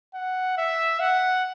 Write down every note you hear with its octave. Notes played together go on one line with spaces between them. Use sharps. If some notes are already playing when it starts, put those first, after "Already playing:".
F#5
E5
F#5